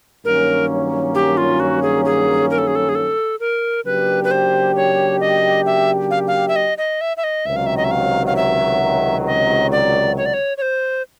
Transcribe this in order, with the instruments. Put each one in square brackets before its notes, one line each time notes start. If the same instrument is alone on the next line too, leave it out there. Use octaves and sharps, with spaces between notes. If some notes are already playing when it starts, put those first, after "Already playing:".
[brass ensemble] G2 D#3 F#3 A#3 C#4 [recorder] A#4
[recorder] G4
F4
F#4
G#4
G#4
A#4
A4
G#4
A4
G#4
A4
A#4
[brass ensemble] C#3 F#3 A#3 D4 G4 [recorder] B4
[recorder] B4
C5
C#5
D#5
E5
F5
F5
E5
D#5
D#5
E5
E5
D#5
[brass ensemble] C#2 C3 D#3 F#3 [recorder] E5
[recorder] F5
E5
D#5
E5
F5
F5
E5
D#5
D5
C#5
D5
C#5
C#5
C5